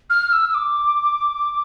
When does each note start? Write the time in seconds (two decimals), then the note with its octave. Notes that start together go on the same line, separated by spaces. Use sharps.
0.09 F6
0.32 E6
0.49 E6
0.54 D6